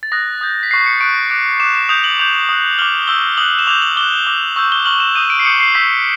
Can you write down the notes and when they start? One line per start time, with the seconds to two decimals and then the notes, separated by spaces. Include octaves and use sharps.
0.03 A6
0.12 D#6 F#6 A#6
0.41 D#6 G6
0.63 B6
0.71 C#6 F#6 C7
0.86 C#7
1.00 C#6 F#6 D7
1.30 D6 F#6 D7
1.60 D6 F#6 E7
1.75 E7
1.89 D#6 G6 F7
2.04 F#7
2.19 D6 G6 F7
2.49 D#6 F#6
2.78 D6 F6 F#7
3.08 C#6 E6 G6 G7
3.38 D#6 F#6 F#7
3.59 E7
3.67 D6 F7
3.70 G6
3.82 F#7
3.97 D6 F#6 G7
4.27 D6 F6
4.56 C#6 E6 G6
4.72 G7
4.85 C#6 F6 F#7
5.00 E7
5.15 D#6 G6 D#7
5.30 D7
5.39 C7
5.45 D#6 G6 C#7
5.60 C7
5.74 C#6 E6 G6 B6